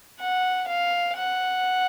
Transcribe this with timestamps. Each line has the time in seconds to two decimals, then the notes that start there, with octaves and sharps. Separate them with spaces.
0.20 F#5
0.67 F5
1.17 F#5